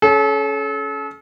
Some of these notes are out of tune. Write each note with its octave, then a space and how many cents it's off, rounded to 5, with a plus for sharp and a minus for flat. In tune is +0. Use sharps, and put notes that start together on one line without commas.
C#4 +10 A4 -40